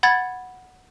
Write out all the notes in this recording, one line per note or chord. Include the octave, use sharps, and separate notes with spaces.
F#5 B5 G#6 A6